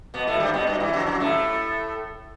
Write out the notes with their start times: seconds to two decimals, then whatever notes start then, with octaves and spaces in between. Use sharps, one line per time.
0.14 B2 B3
0.27 A2 A3
0.40 G2 G3
0.54 B2 B3
0.67 G2 G3
0.80 E2 E3
0.93 F#2 F#3
1.07 F#2 F#3
1.20 A2 A3